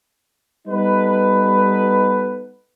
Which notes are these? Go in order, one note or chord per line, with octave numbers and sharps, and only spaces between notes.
G3 B3 D#4 A4 B4